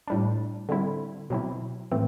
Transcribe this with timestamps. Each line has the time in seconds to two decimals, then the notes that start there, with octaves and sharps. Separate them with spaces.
0.08 A2 G3 D4
0.69 D3 G3 C4 E4
1.30 B2 F#3 C4 E4
1.92 A2 E3 A3 C4